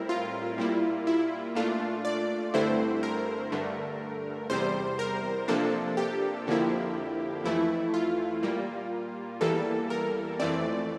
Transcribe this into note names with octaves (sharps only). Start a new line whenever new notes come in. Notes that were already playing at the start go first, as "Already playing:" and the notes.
Already playing: A2 G3 C4 E4 A#4
F4
A#2 G3 A#3 E4
E4
A#2 A3 D4 F4
D5
G2 D3 A3 C4 E4 C5
A#4
G2 D3 A3
E2 C3 G3 C5
A#4
C3 F3 A#3 D4 A4
G4
F2 D3 F3 A#3 E4
F2 E3 A3 E4
F4
A#2 G3 A#3
E2 E3 G3 A#3 A4
A#4
F2 E3 A3 C4 D5